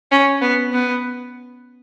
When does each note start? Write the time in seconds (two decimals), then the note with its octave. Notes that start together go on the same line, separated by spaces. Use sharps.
0.12 C#4
0.42 B3
0.73 B3